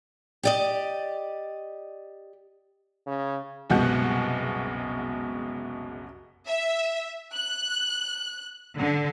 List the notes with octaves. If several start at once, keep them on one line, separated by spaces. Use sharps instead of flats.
G4 D5 D#5
C#3
F#1 C2 B2 G#3 F#5 F#6
E5
F#6
D3